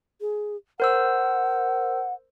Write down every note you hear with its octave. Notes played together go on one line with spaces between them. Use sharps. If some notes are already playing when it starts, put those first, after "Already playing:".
G#4
A#4 C5 F#5 E6